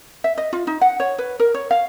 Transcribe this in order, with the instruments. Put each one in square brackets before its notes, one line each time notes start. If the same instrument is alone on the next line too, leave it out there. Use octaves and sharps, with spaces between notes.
[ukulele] E5
D#5
F4
D#4
F#5
C#5
B4
A#4
C#5
F5